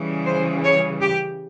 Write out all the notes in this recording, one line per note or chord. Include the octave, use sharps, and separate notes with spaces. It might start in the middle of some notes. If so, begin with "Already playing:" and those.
Already playing: C#3 E3 G3
C5
C#5
G4